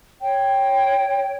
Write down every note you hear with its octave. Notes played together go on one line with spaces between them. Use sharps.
C#5 G5